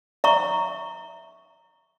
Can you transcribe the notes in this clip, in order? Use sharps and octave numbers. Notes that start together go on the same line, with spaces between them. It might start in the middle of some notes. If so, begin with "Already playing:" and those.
E5 A#5 C#6